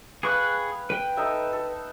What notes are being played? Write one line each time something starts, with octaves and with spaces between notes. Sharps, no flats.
G#4 B4 F5 G5 C#6 F#6
B4 G5
D#4 A4 E5
A4